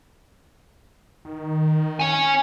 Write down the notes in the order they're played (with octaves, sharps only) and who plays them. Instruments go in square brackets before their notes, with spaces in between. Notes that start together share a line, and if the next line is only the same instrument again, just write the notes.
[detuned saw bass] D#3
[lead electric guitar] C#5 G#5